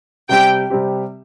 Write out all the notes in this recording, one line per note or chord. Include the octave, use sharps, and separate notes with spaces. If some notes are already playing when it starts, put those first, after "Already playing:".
C3 G3 C4 G4 G5
C3 G3 C4 G4